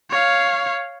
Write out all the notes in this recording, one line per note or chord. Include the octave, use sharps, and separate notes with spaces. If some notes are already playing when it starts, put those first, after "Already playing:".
C#5 F5